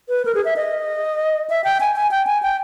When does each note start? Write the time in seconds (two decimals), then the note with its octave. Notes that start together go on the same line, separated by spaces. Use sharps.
0.09 B4
0.25 A#4
0.35 G#4
0.45 E5
0.56 D#5
1.50 E5
1.64 G5
1.80 G#5
1.96 G#5
2.11 G5
2.27 G#5
2.43 G5